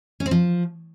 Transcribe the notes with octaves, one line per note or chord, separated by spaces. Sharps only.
C#4
C4
F3